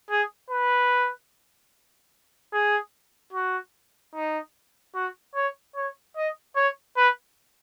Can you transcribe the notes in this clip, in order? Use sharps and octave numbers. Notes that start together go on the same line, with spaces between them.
G#4
B4
G#4
F#4
D#4
F#4
C#5
C#5
D#5
C#5
B4